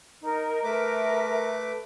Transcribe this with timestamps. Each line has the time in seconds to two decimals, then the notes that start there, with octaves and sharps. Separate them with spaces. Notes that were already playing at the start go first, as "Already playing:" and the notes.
0.23 D#4 A#4
0.64 A3 A#4 B4 E5 D6